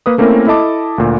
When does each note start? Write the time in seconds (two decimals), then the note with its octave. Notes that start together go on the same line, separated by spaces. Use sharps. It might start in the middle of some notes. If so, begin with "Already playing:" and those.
0.06 A#3 B4 D#6
0.18 A3 A#3 C4 C#4 E4 A#4
0.47 E4 A4 D#5 A5 D6
0.98 D2 A#2